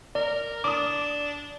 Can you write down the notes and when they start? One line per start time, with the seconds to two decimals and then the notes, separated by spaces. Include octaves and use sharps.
0.15 A#4 D5
0.64 D4 D6 D#6